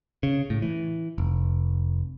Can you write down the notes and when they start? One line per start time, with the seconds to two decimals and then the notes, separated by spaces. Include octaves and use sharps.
0.23 C#3
0.50 A2
0.62 E3
1.18 F1